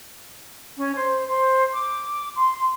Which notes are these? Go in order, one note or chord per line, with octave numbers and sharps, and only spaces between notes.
C#4
C5
C5
D6
C6